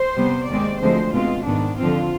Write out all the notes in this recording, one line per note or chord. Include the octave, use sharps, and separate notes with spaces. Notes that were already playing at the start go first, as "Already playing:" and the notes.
Already playing: C5
C3 G3 B3
D#2 D#3 G#3 C4 D5
D2 D3 F3 G#3 C4 C5
B2 G#3 C4 F4
G#2 D#3 B3 D4
F2 D3 F3 C4 F4